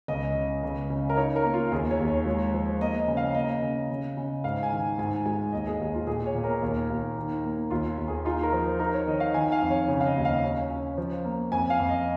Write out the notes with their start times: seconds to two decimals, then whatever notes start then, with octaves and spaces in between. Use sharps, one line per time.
0.08 C#2 D#5
0.35 C#3
0.64 C#2
0.90 C#3
1.10 A#4
1.17 D#4 C#5
1.36 A#4
1.44 A#3
1.54 F4
1.72 D#2 G#4
1.91 C#5
2.00 D#2
2.08 C#5
2.26 G#3
2.54 F3
2.81 A#3 D#5
2.99 D#5
3.07 C#3
3.17 F5
3.35 A#3 D#5
3.62 C#3
3.90 C#3
4.17 C#3
4.44 G#2 F5
4.63 G#5
4.72 D#3
4.98 G#2 G#5
5.26 G#3 G#5
5.53 D#2 D#5
5.67 G#4
5.80 D#2
5.94 F4
6.07 A#2 G#4
6.26 C#5
6.34 A#2
6.44 A#4
6.62 D#2
6.90 D#2
7.17 D#3
7.44 A#3
7.70 D#2 F4
7.98 D#2
8.08 G#4
8.25 D#4 F4
8.43 A#4
8.53 F3
8.79 D#4 A#4
8.94 C#5
9.07 D#3 D#5
9.20 F5
9.34 D#3 G#5
9.52 F5
9.62 F2
9.70 C#5
9.88 C#3
10.00 F5
10.06 D#5
10.16 D#2
10.25 F5
10.44 C#4
10.71 C#4
10.98 F3
11.25 A#3
11.52 F2 G#5
11.70 F5
11.80 F2
11.89 D#5